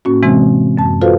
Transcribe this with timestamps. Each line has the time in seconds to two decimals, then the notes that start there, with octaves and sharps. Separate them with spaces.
0.05 A2 A#3 C#4 F#4
0.23 C3 E3 G#3 C4
0.77 F#2 A5
1.01 F4 F#4 A4 B4 C5 F5